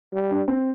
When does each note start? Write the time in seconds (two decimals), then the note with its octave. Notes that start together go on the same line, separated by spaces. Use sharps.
0.13 G3
0.31 D4
0.48 C4